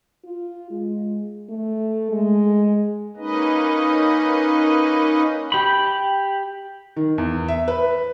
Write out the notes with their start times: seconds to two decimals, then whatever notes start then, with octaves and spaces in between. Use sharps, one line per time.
0.25 F4
0.70 G#3
1.49 A3
2.12 G#3
3.17 A#3 C#4 D#4 B4 D#5
5.52 G4 B5
6.96 D#3
7.18 E2
7.48 E5
7.68 B4